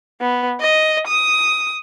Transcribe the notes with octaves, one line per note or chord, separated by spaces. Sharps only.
B3
D#5
D#6